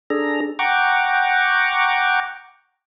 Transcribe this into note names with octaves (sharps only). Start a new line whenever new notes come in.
D4 G#4 A4 A#5
F#5 G5 A#5 C#6 D6